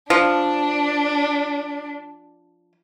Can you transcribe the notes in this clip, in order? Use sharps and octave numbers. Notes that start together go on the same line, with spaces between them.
F3 D4